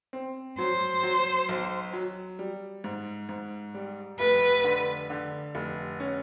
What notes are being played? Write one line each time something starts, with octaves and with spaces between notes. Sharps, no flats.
C4
F#3 C5
F#3
B1
F#3
G3
G#2
G#2
G3
F1 B4
D3
D3
F1
C#4